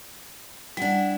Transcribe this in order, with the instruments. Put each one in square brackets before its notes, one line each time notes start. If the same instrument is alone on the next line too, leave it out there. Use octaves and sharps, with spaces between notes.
[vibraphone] G3 F#5 [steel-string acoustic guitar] D4 E4